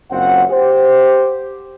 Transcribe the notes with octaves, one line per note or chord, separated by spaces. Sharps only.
F#1 F#2 C4 F4 F#5
G4 C5